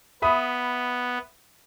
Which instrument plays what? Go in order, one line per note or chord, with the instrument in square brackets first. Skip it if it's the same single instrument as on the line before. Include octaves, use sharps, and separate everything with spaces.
[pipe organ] B3 [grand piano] E5 B5 D#6